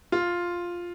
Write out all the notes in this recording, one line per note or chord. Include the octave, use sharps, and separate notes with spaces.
F4